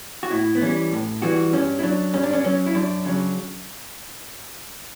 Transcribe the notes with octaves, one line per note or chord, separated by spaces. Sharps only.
F#4
A2 E4
B3
E3 G3 C#4
A2
E3 G3 F#4
G2 C#4
E4
F#3 D4
G2 C#4
D4
C#4
F#3 C#4
E4
F#2 D4
C#3 F#3